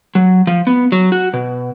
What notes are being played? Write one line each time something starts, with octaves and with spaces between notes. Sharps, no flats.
F#3
F3
B3
F#3
F#4
B2